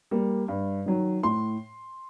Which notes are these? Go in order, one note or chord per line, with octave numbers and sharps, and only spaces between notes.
G3 A#3
G2
D#3 F#3
A2 C6